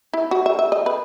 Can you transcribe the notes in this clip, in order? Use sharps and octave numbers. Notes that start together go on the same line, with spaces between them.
E4
F#4
E5
E5
D#5
B4